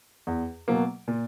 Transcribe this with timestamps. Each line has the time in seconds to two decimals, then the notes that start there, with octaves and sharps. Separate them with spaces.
0.27 E2
0.68 B2 F#3 A#3
1.08 A#2